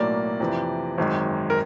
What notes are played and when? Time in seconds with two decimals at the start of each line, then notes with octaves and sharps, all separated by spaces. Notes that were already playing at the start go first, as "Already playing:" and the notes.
Already playing: B1 A2 F#3 A#3 D5
0.40 F2 C3 E3
0.98 G#1 F#2 D#3 G#3
1.50 A#4